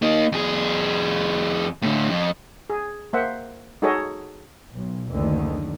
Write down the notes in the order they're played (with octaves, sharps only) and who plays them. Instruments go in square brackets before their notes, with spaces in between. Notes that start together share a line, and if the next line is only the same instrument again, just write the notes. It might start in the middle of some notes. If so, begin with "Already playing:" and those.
[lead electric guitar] A#3 D#4
F2 G#4
A2 D3
F2
[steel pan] G#4
A#3 C5 E5 F#5
D#4 F#4 G#4 A4 C#5 D#5
[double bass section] B1
F#1 D2 D3 D#3